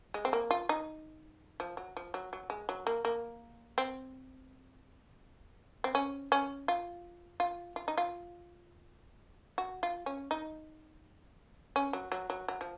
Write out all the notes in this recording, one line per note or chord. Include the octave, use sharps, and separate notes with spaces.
G#3
C4
A#3
F4
D#4
F3
F#3
F3
F#3
F#3
G#3
F#3
A#3
A#3
C4
C4
C#4
C#4
F4
F4
F4
D#4
F4
F#4
F4
C#4
D#4
C#4
F#3
F#3
F#3
F#3
F3